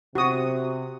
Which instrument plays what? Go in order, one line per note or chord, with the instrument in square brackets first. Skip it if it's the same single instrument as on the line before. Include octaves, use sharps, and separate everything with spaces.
[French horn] C3 [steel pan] F#4 D#6